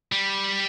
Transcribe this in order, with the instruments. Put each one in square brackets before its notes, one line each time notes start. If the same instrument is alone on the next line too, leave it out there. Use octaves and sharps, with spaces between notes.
[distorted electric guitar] G3